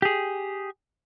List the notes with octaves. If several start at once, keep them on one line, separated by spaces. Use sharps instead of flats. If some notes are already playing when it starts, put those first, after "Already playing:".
G4 G#4